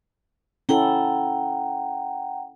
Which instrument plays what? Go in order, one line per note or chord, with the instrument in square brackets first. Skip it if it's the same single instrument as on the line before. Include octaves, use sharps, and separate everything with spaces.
[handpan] C#4 E4 A4 [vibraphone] F#5 G5 A#5